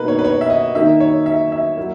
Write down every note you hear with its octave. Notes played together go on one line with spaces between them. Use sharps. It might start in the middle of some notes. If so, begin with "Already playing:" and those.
Already playing: B2 A#3 D#4 B4
C#5
B4
C#5
E5
D#5
D#3 A#3 D#4 E5
C#5
E5
E5
F#3 A#3 E4